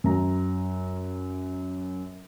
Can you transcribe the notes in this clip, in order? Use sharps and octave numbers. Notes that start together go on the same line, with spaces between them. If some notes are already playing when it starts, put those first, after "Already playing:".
F#2 A#5